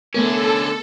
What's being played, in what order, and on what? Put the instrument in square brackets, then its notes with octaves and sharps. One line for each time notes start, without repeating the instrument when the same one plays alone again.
[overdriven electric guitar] D3 C#4 [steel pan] A3 B3 A#4 [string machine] A4